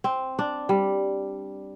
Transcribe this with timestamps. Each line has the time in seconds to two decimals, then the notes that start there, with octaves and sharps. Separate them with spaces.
0.04 C4
0.39 D4
0.69 G3